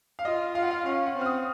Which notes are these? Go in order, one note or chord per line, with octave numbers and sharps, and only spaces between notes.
F5
F4 D#5
F4 F5
F#5
F5
C#4 F5
F#5
C4
F6
D#6